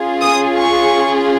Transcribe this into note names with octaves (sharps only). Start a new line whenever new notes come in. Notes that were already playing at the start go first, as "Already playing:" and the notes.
Already playing: C#4 F4 G#4
D#6
C#6